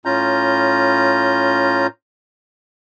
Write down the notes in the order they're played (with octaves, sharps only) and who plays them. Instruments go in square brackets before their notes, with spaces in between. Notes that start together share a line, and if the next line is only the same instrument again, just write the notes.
[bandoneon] A2 C#4 F4 A#5 G6